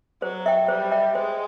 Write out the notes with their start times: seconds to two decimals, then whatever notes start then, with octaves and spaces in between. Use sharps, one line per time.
0.22 F#3 C5
0.46 E5 G5
0.69 G3 C5
0.92 E5 G5
1.15 G#3 C5